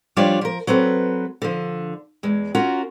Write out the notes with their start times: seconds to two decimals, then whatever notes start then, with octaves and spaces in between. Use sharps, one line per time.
0.16 F3 G3 D4 F4 C#5 D5
0.41 F3 A#4
0.67 F#3 C4 A4 B4
1.42 D3 F3
2.23 E2 G#3
2.55 C#4 F4 F#4 A#4